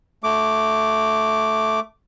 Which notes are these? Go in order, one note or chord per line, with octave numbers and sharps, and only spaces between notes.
A3 D6